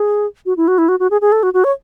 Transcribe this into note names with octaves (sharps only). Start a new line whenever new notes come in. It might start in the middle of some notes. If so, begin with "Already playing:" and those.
Already playing: G#4
F#4
E4
F#4
E4
F#4
F#4
G#4
G#4
A4
F#4
F#4
C#5